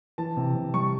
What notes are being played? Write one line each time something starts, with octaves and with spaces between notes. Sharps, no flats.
E3 A5
C3
C3
G3 C#6